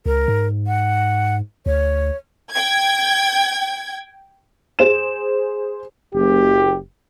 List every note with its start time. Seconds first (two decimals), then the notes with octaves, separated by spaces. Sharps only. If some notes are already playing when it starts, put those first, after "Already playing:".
0.06 C#2 A#4
0.28 G#2
0.67 F#5
1.66 D2 C#5
2.51 G5 G#6
4.79 G#4 C5 E7
6.14 F#1 G4